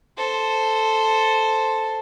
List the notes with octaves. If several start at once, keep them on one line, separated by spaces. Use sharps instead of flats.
A4 C5